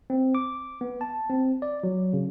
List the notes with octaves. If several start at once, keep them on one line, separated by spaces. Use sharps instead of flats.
C4
D6
B3
A5
C4
D5
F#3
C#3